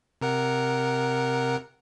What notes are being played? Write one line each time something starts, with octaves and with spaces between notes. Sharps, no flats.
C3 A#4 F#5